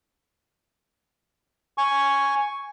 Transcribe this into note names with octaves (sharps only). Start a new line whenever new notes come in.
G#5 C#6